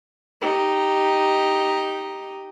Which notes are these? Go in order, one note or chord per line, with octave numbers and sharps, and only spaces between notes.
D#4 G4